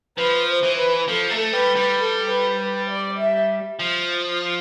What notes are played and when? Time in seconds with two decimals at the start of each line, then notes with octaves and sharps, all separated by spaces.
0.17 F3 B4
0.48 C5
0.63 E3
0.78 B4
1.08 F3 A4
1.31 A3
1.53 G3 B4
1.76 G3
1.99 A4
2.29 B4
2.59 B4
2.89 D5
3.19 E5
3.79 F3